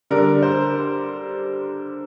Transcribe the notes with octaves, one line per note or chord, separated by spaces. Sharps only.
D3 G3 D4 A#4
C5